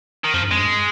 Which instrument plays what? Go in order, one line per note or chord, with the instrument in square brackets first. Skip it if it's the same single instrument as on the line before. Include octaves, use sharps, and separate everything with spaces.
[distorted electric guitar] D#3
[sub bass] F2 [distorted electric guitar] F3
[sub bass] G2
[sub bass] F2 [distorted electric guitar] G#3
[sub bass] G2